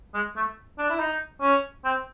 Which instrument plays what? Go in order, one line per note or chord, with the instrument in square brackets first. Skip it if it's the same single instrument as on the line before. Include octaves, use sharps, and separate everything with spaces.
[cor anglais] G#3
A3
D4
E4
D#4
C#4
C4